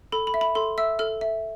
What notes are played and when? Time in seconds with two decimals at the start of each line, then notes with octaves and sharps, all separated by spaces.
0.12 A4 B5
0.27 B5
0.34 E5
0.41 B5
0.55 A4 C6
0.78 E5 E6
0.99 A4 F6
1.21 E5